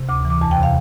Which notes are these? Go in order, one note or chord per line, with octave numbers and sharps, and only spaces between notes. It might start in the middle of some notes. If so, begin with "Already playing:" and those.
Already playing: C3
D2 D6
E3
D6
E2 A5
G5
C3
F5